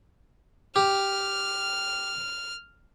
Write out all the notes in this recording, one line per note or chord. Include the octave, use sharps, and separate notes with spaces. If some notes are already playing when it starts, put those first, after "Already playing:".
G4 F6